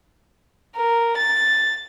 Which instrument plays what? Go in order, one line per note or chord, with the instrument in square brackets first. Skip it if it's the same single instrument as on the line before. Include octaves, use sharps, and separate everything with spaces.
[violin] A#4
A6